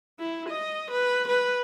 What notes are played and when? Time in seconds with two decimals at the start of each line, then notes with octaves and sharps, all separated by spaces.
0.19 E4
0.49 D#5
0.91 B4
1.28 B4